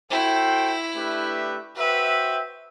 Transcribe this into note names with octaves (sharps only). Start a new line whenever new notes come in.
E4 F#4 A4 C5 G5
A3 D4 G4 B4 E5
F#4 B4 C5 E5 G5